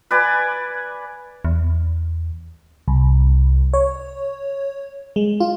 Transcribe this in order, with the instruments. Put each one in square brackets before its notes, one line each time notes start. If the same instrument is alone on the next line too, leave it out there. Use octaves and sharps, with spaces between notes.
[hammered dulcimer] B4 D5 G#5
[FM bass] E2
[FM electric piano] C2
C#5
G#3
F4